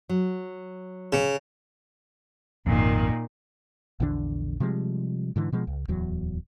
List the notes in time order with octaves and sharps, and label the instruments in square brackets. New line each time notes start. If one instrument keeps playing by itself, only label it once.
[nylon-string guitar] F#3
[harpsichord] C#3
[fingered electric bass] G#1 F2 [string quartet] A#2 D#3
[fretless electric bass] A#1 E2 D3 D4
C3 F3 G3 G#3
G#2 D3 E3
B2 F3 G#3
C#2
D1 E2 F#3